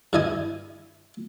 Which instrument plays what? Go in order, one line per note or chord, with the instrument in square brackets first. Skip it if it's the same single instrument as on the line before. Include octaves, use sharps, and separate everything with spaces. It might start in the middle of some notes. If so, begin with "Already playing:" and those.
[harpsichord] G2 E3 E4 D#5 G#5